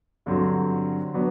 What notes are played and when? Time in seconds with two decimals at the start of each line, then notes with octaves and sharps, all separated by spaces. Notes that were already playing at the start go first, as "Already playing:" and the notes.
0.26 G2 D3 F#3 C4
1.14 F#3 B3 D4